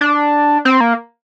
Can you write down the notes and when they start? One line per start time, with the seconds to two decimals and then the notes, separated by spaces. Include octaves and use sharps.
0.01 D4
0.65 C4
0.81 A#3